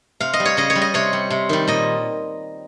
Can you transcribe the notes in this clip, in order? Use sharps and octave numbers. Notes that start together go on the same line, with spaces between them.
C3 F5
D#5
G3
C#5
C#3 D#5
C#5
G3
D#5
C3 C#5
G3
C3
D#3 G3
A#2 D#5